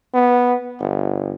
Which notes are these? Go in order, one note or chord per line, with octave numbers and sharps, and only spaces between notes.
B3
G1